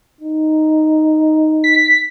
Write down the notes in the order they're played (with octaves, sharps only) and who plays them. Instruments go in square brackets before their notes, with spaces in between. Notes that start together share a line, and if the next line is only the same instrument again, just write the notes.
[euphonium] D#4
[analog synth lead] B6